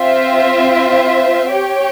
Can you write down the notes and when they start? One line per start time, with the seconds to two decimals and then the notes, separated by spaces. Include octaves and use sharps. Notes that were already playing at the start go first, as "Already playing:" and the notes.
Already playing: C4 F4 C5 E5
1.52 G4 C#5 G5